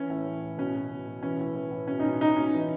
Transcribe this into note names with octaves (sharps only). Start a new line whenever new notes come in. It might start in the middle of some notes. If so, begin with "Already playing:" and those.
Already playing: E3 C#4
A2
E3
A2
B2 C#4
B2
B2
B2
E3 C#4
A2
E3
A2
B2 C#4
D#4
B2 C#4
B2 D#4
B2 C#4
E3